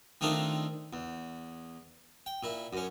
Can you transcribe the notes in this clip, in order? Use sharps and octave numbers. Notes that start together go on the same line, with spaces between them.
D#3 A3 C4 D4 D#4 F4
E2
G5
A#2 E4
F#2 C#4